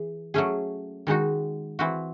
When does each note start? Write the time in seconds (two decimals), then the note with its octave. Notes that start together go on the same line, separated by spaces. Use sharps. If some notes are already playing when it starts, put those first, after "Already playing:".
Already playing: E3 G#4
0.34 F#3 A3 C#4 G#4
1.07 D#3 G#3 D#4 F#4
1.79 E3 C4 F#4